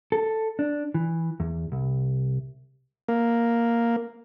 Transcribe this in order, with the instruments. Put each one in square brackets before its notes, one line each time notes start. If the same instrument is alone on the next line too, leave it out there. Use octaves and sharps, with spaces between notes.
[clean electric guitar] A4
D4
E3
E2
C2
[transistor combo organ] A#3